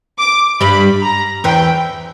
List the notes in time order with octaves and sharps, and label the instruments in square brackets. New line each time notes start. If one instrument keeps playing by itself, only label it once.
[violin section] D6
[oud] G2 G3 [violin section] B5
[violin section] A#5
[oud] E2 E3 [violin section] G5